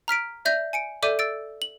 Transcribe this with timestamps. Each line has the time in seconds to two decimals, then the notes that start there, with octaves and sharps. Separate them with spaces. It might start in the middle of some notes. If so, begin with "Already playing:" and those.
0.08 A#5 F6 B6 D7
0.45 D5 E5 G6 A#6
0.73 G#5 C#7 D7
1.02 A4 D5 E5 D6 G6 D#7
1.19 E6 A6 D7
1.62 F#7